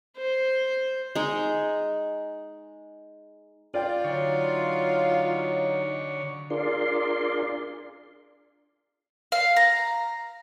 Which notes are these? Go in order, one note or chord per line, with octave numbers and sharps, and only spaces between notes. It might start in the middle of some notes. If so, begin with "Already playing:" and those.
C5
G#3 D#4
F4 D5 G5
D3 F#3 D#4 C#5
D4 F4 G#4 A#4 D5 C6
F5
A#5